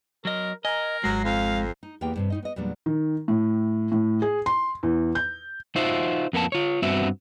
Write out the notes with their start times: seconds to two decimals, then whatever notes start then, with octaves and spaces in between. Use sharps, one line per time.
0.25 F#3 A#4 D#5
0.65 A#4 D#5 G#5 A#5
1.04 G#1 F#3 G#3 A#6 C7
1.25 F2 F5
1.83 D#4
2.01 E2 A#3 B3 E4 G4 G5
2.16 G2 C3 C4
2.30 A2 D#4 D#5
2.42 B3 D#5
2.56 E2 A#2 F#3 G3 D4
2.86 D#3
3.28 A2
3.92 A2
4.22 G#4
4.46 C6
4.83 E2
5.15 G6
5.76 D#4 F4 F#4 C5 E5
6.33 F2 A#3 B3 A5
6.52 F4 C#5
6.82 G2 B3 C4 F#4 E5